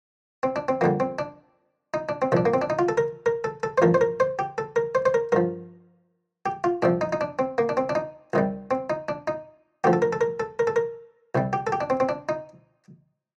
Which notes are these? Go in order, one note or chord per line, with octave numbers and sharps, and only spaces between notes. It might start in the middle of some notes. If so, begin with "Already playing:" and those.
C4
D4
C4
F2 D3 G3 A#3
C4
D4
D#4
D4
C4
C2 A#2 F3 D4
A#3
C4
D4
D#4
F4
A4
A#4
A#4
A4
A4
C5
A1 G2 F3 A#4
C5
A#4
C5
G4
A4
A#4
C5
C5
A#4
G2 F3 A#4
G4
F4
C2 C3 F3 D4
D#4
D#4
D4
C4
A#3
D4
C4
D4
D#4
C2 C3 D#3 G3
C4
D#4
D4
D#4
D2 D3 F3 G4
A4
A#4
A4
A#4
A4
A#4
A4
A#4
C2 C3 G3
G4
A4
G4
D4
C4
C4
D4
D#4